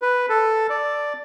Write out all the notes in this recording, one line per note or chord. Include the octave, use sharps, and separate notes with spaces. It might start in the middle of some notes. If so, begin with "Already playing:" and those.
B4
A4
D5